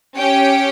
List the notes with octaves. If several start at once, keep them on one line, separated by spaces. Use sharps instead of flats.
C#4 G4 G5